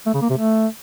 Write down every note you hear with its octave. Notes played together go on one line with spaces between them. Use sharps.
A3
C#3
A#3
C3
A3